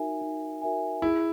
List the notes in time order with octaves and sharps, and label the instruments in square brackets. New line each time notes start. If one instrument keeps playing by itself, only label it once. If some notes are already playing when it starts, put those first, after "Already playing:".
Already playing: [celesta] D#4 F#4 A#4 E5 G#5
D#4
F#4 A#4 E5 G#5
[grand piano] E4 [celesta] G#4